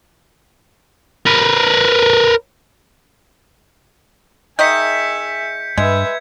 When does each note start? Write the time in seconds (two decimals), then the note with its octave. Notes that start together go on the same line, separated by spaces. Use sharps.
1.26 A#4 B4
4.59 D#3 G#4 D#5 E5 G6 B6 C#7
5.78 G2 G#3 B4 E5 G#6